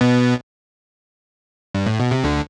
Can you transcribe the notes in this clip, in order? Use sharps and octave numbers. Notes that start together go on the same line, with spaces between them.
B2 B3
G2
A2
B2
C3
D2 D3